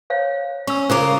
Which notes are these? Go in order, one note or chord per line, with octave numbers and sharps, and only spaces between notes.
C5 C#5 F5
C#4 C#6 E6
C#3 F4 A#4 C5 D6